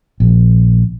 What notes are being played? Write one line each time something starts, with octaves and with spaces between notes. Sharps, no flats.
A#1